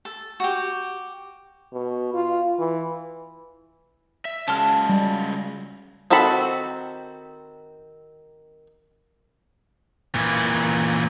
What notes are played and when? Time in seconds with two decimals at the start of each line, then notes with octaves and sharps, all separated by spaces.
0.05 A4
0.40 F#4 G4
1.73 B2
2.14 F4
2.59 E3
4.25 E5
4.48 C#3 F#3 G#3 A5 C6 F6
4.89 G3
6.10 D#3 C4 F#4 A4 B5
10.15 A#2 E3